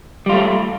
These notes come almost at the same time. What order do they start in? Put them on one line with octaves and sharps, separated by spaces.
G3 F4 A3